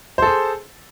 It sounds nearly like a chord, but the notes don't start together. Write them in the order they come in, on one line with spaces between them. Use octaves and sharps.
C5 A4 G#4